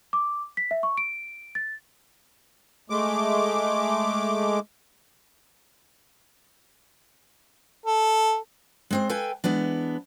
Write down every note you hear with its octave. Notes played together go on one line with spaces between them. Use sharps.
D6
B6
E5
C#6
D7
A6
G#3 A3 D6
A4
G#3 C4 C5
A4 B4 F5 G5 G#5
E3 G#3 B3 D4